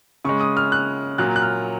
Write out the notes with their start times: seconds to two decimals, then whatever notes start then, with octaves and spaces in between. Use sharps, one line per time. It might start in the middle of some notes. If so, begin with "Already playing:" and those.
0.25 C#3 G#3 C#6
0.41 D#6
0.57 F6
0.72 F#6
1.18 A#2 F#3 A#3 F#6
1.36 F#6
1.42 F6